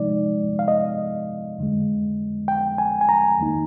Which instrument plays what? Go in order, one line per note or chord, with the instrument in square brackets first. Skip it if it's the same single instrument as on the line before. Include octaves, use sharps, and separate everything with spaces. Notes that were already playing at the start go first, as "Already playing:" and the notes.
Already playing: [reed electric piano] C3 F3 G#3 D#4 D5
F5
D#5
F2 D3 G#3
G5
G#5
G#5
A#5
F2 D#3 A#3 D#4